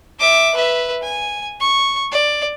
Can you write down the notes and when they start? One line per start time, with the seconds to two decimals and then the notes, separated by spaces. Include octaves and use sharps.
0.20 E5 D6
0.55 B4 E5
1.03 G#5
1.60 C#6
2.12 D5